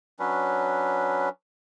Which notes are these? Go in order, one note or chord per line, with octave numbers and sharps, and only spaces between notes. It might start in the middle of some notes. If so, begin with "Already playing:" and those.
F#3 C#4 D4 B4